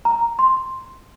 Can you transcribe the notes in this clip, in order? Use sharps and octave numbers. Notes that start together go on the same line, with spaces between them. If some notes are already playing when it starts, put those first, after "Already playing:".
A#5
C6